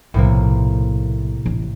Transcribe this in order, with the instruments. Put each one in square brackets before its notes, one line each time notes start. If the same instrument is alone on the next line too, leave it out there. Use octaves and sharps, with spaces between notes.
[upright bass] B1 F3 [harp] A2 C3 A#3
[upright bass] A1